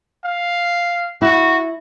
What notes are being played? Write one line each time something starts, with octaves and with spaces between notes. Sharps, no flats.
F5
E4 F#4